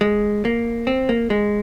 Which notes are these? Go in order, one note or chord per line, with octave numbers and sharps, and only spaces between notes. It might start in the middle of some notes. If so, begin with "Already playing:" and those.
G#3
A#3
C4
A#3
G#3